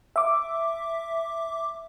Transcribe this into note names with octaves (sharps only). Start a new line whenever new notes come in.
E5 D6